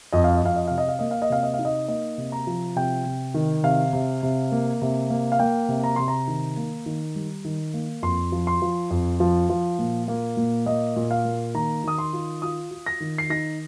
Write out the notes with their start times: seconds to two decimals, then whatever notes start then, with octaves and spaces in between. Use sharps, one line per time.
0.12 F2 D#5
0.24 F5
0.35 D#5
0.42 F2 F5
0.56 D#5
0.67 C3 F5
0.78 D#5
0.88 F5
0.99 A#3 D#5
1.11 F5
1.22 D#5
1.30 C3 F5
1.43 D#5
1.54 F5
1.59 D#4
1.65 D#5
1.88 A#3 D#5
2.18 C3
2.32 A#5
2.47 F3
2.76 C3 G5
3.06 C3
3.34 D#3
3.63 C3 F5
3.93 C3
4.23 C3
4.52 A#3
4.82 C3
5.10 A#3
5.32 F5
5.39 A#3 G5
5.69 C3
5.84 A#5
5.96 C3 C6
6.08 A#5
6.27 D#3
6.57 A#3
6.86 D#3
7.15 G3
7.45 D#3
7.74 A#3
8.02 F2 C6
8.32 F3
8.47 C6
8.62 F3
8.91 F2
9.20 F3
9.49 F3
9.79 A#2
10.08 A#3
10.37 A#2
10.66 A#3 D#5
10.96 A#2
11.11 F5
11.25 A#3
11.54 D#3 A#5
11.84 D#3 D#6
11.98 C6
12.13 F4
12.42 F4 D#6
12.71 F4
12.86 A#6
13.00 D#3
13.18 C7
13.30 D#4 A#6